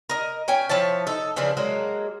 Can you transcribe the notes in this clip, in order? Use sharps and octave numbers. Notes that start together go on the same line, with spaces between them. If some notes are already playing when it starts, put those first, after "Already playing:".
A#4 D#5
C#4 G5 G#5
F3 E4 C#5 A5
D#4 A4
C#3 E3 F3 D4
F#3 G#3 A#3